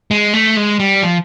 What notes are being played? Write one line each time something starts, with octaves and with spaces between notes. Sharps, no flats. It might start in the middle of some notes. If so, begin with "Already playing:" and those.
G#3
A3
G#3
G3
F3